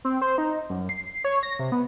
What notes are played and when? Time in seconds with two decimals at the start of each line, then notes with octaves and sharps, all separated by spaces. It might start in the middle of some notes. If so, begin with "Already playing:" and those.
0.05 C4
0.22 C5
0.38 D#4
0.70 F#2
0.89 C7
1.24 C#5
1.43 A#6
1.59 C3
1.72 B3